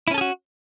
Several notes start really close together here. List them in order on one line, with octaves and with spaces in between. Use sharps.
E4 C#4 A4 G#4 F#4